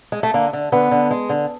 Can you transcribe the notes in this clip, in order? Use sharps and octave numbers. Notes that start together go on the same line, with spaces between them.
G#3
A3
D3 A#3
D3
D3 B3
D3
G#3
D3